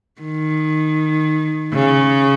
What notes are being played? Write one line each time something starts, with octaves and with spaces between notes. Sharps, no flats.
D#3
C#3